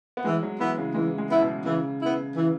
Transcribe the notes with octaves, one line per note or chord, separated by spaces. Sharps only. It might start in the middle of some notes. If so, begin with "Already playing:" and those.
B3
E3 G#3
F#3
E3 B3 E4
C#3
E3 G#3
G#3
B3 E4
B2
C#3 E3
B3 E4
E3